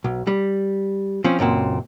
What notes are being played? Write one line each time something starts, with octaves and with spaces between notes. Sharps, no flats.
B1
G3
F3 C4 C#4
C#2 F#2 A#2 C4